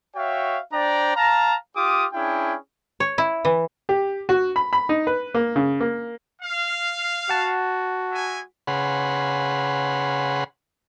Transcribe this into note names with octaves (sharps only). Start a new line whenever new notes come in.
F#4 C#5 E5 F5 G5
D4 C5 D5 G5 A#5
F5 A5 A#5
F4 G4 D6 D#6
C#4 D4 E4 G#4 G5
C#5
E4
E3
G4
F#4
B5
B5
D#4
B4
A#3
C#3
A#3
F5
F#4 F#5 A5
G#3 E5 G#5
C#3 G#4 B4 F#5 C6